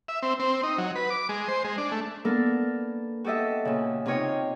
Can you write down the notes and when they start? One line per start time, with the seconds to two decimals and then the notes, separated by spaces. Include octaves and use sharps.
0.08 E5
0.22 C4
0.40 C4
0.63 D#4
0.78 F#3
0.96 B4
1.10 D6
1.29 G#3
1.48 C5
1.64 G#3
1.78 D4
1.92 A3
2.25 A#3 B3 D4 A4 A#4
3.24 F#4 G4 A4 D#5 E5
3.65 A#2 C#3
4.06 C3 D#4 F4 C#5 D#5 G5